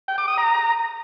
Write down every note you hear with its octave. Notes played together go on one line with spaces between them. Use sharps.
G5
D6
D#6
A#5